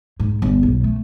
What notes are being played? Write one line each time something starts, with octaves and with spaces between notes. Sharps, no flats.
G#2
G1
B1
A3